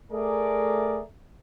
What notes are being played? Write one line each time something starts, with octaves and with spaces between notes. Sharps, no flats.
A3 G#4 A#4 D5